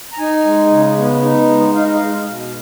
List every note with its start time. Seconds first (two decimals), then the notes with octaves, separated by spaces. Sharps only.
0.13 A#5
0.18 D#4 G#5
0.45 G#3
0.70 C#3
0.97 B3
1.23 D#4
1.49 G#3
1.75 D#4 F5
1.84 D#5
1.94 F5
2.01 G#3
2.27 B2